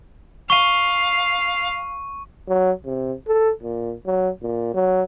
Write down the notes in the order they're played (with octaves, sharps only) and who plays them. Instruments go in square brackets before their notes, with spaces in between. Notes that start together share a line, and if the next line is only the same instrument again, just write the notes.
[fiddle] F5 [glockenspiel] C#6 D#7
[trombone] F#3
C3
A4
A#2
F#3
A#2
F#3